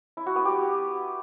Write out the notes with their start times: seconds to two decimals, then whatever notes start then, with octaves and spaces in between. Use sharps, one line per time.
0.17 E4
0.26 F#4
0.36 B3
0.45 G4